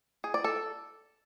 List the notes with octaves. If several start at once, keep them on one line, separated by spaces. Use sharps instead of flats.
G#4
D5
A4